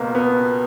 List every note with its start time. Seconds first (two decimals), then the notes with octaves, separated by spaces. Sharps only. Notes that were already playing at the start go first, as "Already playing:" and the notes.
Already playing: C#2 B2 A#3 B3
0.15 B3